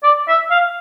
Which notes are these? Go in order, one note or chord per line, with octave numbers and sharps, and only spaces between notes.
D5
E5
F5